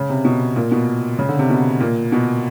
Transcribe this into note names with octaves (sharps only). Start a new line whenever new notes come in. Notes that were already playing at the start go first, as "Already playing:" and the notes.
Already playing: C#3
C3
B2
A#2
B2
C#3
D3
C3
B2
A#2
B2